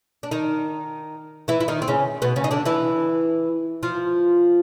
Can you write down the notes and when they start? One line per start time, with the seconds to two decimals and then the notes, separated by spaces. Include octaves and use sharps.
0.23 D4
0.31 D#3 D#4
1.48 E3 E4
1.61 E4
1.68 D#3 D#4
1.82 C4
1.88 C#3 C#4
2.22 B2 B3
2.36 C#3 C#4
2.44 D#4
2.51 D3 D4
2.65 E3 E4
3.83 F3 F4